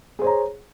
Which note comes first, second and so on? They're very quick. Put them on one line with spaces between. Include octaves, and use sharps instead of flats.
G#4 C5 C#5 A#5